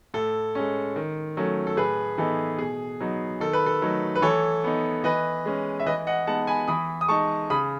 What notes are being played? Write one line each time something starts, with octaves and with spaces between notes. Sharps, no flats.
A2 A4
G#3 C#4
D#3
F#3 A3 C#4
A4
A2 G#4 B4
E3 B3 D#4 A4
B2 G#4
F#3 B3 D#4
D#3 A4
B4
A4
F#3 A3 D#4
B4
E3 A4 C#5
B3 D#4
E3 B4 D#5
G#3 C#4
E5
E3 B4 D#5
D#5 F#5
G#3 B3 D#4 F#5 A5
G#5 B5
E3 B5 D#6
D#6
G#3 D#4 A5 C#6
C#3 B5 D#6